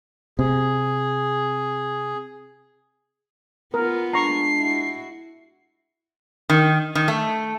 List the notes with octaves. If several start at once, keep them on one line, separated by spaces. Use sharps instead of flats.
C3 G#4
B3 F4 A#4
G#3 D4 A#5 C#6 C7
E4 F#4
D#3
D#3
A3